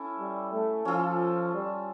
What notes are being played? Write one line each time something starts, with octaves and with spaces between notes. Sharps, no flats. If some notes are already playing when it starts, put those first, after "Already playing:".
Already playing: C#4 E4 A4
G3
A3
F3 C#4 F4 A4
G3